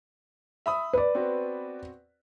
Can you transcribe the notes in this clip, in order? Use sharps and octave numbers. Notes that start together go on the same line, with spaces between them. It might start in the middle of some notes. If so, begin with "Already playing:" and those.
E5 B5 D#6
B4 D5
B3 C4 F#4